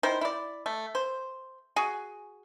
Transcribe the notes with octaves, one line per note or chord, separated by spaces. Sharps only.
D#3 E4 C5
E4 D5
A3
C5
F#4 G#4